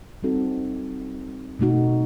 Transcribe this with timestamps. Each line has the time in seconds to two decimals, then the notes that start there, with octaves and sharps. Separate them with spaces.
0.23 G3 C4 D#4 F#4 A4
1.59 B2 A3 D#4 F#4